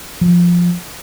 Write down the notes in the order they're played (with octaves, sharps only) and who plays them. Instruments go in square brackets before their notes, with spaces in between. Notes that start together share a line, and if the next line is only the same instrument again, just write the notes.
[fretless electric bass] F3